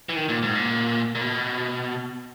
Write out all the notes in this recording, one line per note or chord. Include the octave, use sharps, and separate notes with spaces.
E3
D#3
A#2
G#2
A#2
A#2
B2